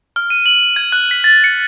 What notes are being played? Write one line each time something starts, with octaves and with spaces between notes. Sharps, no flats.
F6
D#7
F#7
G#6
F#6
B6
A6
C#7